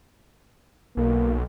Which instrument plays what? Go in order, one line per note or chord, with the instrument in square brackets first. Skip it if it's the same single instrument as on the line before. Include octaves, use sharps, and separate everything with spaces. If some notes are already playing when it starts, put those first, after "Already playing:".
[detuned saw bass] B1 [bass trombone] A#3